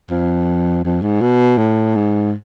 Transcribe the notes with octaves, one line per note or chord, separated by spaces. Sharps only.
F2
F2
G#2
B2
A2
G#2